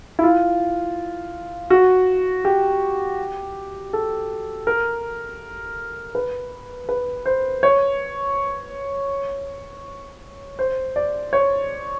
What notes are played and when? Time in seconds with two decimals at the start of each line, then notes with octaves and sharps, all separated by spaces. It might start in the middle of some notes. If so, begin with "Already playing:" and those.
0.19 E4
0.23 F4
1.70 F#4
2.45 G4
3.93 A4
4.67 A#4
6.15 B4
6.89 B4
7.26 C5
7.63 C#5
10.59 C5
10.96 D5
11.33 C#5